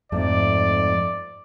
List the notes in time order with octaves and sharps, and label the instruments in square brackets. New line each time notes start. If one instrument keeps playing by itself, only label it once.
[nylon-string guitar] F2 G#2 A3 [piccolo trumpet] D5